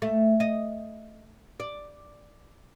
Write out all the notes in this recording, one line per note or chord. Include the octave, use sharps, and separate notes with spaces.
A3
D#5
D5